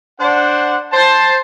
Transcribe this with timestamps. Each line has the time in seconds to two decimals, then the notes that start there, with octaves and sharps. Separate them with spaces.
0.20 D4 C5 F#5
0.92 C5 A5